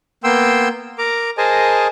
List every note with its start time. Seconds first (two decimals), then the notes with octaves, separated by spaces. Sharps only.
0.24 A#3 B3 G5 C6 E6
0.98 A#4 A#5 D6
1.38 G#4 A#4 C5 D#5 G#5 A5